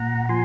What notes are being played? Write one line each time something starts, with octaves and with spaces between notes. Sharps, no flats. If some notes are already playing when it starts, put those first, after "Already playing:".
Already playing: A#2 F#5 A#5
F3 G#5 C6